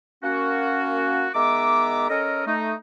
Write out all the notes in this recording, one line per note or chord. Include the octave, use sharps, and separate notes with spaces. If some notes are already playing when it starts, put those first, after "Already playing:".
A#3 C#4 F#4
D#3 G#3 B3 E5 A#5 D6
C#4 A4 A#4 D#5
A3 D#4